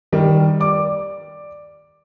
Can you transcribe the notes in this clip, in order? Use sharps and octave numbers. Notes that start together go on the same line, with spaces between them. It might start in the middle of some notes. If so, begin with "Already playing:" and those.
D#3 G3
D5 D6